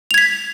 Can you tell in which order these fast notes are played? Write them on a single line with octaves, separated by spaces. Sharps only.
F7 G#6 B6